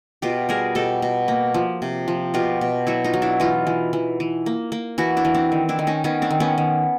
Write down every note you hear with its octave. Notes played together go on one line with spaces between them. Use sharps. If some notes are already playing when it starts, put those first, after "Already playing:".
B2 F4 G4
G3 G#4 A#4
B2 G4 A4
B2
A#3
F3
C3
F3
B2 F4 G4
B2
F#3 E4 F#4
D#4 F4
F#3
D4 E4
E3 D#4 F4
E3
E3
E3
A#3
A#3
E3 E4 F#4
D4 E4
E3
C4 D4
D#3
D4 E4
D#3
C#4 D#4
D#3 B3 C#4
C4 D4
D#3
B3 C#4
D#3